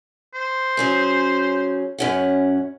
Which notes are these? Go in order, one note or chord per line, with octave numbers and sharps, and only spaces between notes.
C5
F#3 C#4 G#4
F#2 C#4 F#5